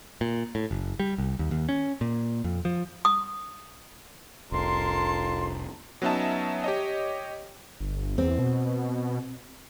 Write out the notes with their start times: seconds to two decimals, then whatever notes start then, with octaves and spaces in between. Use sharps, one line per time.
0.21 A#2
0.55 A2
0.71 F#1
1.00 G3
1.18 C2
1.39 D#2
1.51 D#2
1.69 C#4
2.01 A#2
2.44 F2
2.65 F3
3.05 D#6
4.52 F1 C2 F2 A#4 A5 C6
6.02 F#3 B3 C#4 D#4 E5 A5
6.64 G4 C#5 D#5
7.80 G1
8.18 E2 C4
8.39 B2